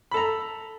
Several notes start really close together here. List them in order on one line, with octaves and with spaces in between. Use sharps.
B5 A4 A#5